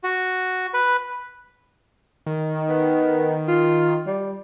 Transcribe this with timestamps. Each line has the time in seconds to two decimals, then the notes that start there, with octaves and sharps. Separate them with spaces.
0.04 F#4
0.74 B4
2.26 D#3
2.69 B3
3.48 F4
4.07 G3